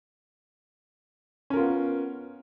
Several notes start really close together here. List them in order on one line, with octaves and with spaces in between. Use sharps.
C#4 A#4 F4 B3